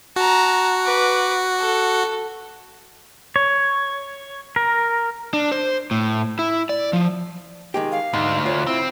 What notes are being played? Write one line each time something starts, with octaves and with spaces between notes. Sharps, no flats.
F#4 A5 A#5
B4 D6
A4
C#5
A#4
D4
C5
A2
E4
D5
F3
D#3 G#3 G4
F5
D2 G#2 D#4
F4 C#5
C4 E4